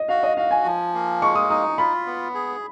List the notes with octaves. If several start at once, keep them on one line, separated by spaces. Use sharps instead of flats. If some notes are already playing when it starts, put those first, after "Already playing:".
Already playing: D#5
F#4 F5
D#5
F#4 F5
G#5
F3
A#3
G#3 C#6
D#6
D#4 D#6
F4 B5
B3
G#4